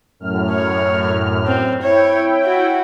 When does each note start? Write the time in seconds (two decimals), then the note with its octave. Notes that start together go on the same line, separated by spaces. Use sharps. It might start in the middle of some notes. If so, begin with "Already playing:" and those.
0.20 F#2 A2 F6
0.52 C#5
1.48 C4
1.83 E4 C#5 G5
2.44 F#4